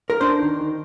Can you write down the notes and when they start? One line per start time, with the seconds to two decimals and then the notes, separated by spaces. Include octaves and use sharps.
0.10 A#4
0.21 D4 C5
0.40 D#3
0.59 D#3